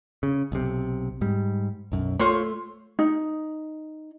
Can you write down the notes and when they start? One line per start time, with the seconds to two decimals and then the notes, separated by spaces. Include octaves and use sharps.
0.23 C#3
0.52 B1 C3
1.21 G#2 G3
1.92 B1 F#2
2.19 A3 F4 C5 C#5
2.99 D#4